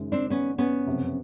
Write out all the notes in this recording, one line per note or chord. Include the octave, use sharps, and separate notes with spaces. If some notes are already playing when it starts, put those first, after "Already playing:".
Already playing: F#1 F#2 D#3 G#3
C4 D4
B3 C#4
B3 C#4
F#1 F2 C3